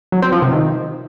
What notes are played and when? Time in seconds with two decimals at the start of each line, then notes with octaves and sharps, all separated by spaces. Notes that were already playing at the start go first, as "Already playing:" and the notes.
0.12 F#3
0.22 C4
0.32 F3
0.42 C3
0.52 D#3